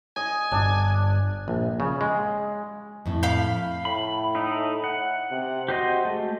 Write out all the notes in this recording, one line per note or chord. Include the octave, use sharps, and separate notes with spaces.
D#5 G#5
G1 G2 D4
A#1
C#3
G#3
F2 A2
F5 B5 G6
A2 B5
D#4 E4
F#5
C3
F#4 G4 C5 D#5
G#3 A3